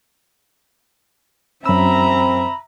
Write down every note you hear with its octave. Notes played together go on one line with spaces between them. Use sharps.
F#2 C4 E5 A#5 B5 E6